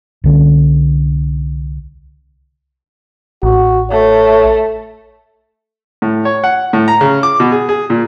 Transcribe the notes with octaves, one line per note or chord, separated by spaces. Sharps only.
C2 D3 C#4
A1 F#4
A3 C#5
A2
C#5
F#5
A2
A#5
C#3
D6
B2
G#4
G#4
A#2